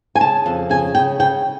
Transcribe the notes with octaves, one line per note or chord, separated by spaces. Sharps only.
G#5
C#3 A5
F2
C#3 G#5
C#3 G5
C#3 G5